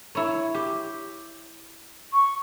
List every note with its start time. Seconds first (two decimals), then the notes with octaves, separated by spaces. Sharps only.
0.15 E4 C#5
0.54 G4
2.12 C#6